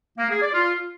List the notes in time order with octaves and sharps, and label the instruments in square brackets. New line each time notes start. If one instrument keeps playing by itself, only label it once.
[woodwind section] A#3
G#4
D5
F4